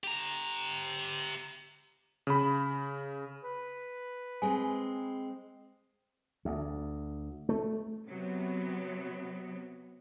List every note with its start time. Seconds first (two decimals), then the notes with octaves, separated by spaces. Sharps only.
0.04 G4 A#5
2.27 C#3 B5
3.43 B4
4.42 G#3 C4 G#5
6.45 D2
7.49 A3
8.06 C3 F#3 B3